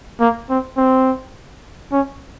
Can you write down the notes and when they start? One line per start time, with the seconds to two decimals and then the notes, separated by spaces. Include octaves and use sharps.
0.20 A#3
0.50 C4
0.78 C4
1.92 C#4